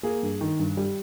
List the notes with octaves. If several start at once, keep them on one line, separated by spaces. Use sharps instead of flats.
A#3 G#4
G2
D#3
G2
G3